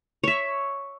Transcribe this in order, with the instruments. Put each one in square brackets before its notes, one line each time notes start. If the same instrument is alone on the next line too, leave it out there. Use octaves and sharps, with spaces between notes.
[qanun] C#5 E5